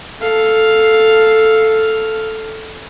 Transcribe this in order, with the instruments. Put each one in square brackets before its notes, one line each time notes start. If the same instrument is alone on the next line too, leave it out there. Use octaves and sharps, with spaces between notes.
[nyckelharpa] A4 F5